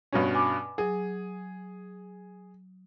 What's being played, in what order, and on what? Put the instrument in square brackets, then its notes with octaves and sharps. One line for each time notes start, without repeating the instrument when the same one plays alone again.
[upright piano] G2 B2 C#4
[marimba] G#5 D6
[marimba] F#3 [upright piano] G#4